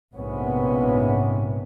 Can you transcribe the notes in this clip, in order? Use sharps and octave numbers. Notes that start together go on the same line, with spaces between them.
A#1 G#2 C3 B3 C#4